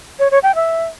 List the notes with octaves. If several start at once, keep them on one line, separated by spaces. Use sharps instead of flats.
C#5
C#5
G5
E5